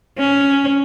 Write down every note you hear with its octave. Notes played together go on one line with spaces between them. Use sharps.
C#4